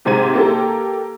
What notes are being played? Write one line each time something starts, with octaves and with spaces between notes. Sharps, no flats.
G#2 C3 G#3 C4 G#6 D#7
A#3 G4 A4